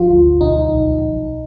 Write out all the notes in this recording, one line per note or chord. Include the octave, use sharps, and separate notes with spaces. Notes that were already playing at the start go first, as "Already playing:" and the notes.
Already playing: G1 F3 F4
D2
B1 D#4
B1
B1